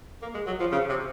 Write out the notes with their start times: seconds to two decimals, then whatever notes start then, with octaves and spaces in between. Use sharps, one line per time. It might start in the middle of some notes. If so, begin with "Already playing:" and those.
0.22 A#3
0.34 G#3
0.47 F#3
0.60 F3
0.72 C#3
0.89 C3